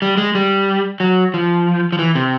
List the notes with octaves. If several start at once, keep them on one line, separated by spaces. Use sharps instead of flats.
G3
G#3
G3
F#3
F3
F3
E3
C3